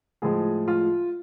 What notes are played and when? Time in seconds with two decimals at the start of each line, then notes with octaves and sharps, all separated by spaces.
0.22 A2 F3 G#3 G#4
0.68 F4